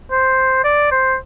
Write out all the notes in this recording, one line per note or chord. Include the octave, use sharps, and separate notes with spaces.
C5
D5
C5